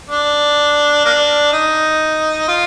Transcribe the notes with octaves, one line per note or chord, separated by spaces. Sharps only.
D4
A#3 D4
D#4
F4